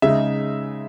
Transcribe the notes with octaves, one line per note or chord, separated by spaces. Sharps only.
C#3 G#3 D#4 E5